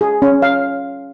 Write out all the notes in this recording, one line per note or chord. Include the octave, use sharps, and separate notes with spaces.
G#4
C#4
F5